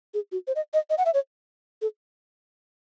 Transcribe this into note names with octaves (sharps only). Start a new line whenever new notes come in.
G#4
F#4
C5
D#5
D#5
D#5
F#5
E5
C#5
A4